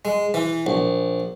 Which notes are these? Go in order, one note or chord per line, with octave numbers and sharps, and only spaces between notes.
G#3
E3
A#1